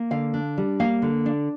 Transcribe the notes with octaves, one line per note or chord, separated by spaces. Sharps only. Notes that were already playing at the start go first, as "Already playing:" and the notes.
Already playing: A#3
D3 F5
D4
G3
A#3 F5
D3
D4